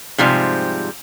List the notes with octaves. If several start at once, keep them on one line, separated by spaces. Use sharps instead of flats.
G#2 C3 F3 G3